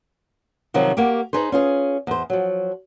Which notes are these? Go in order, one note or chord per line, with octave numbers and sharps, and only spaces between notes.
C3 D#3 F3 F#3 C4
A#3 F#4 G4
D#4 G#4 B4 C5
C#4 F4 G#4
E2 C5
F3 F#3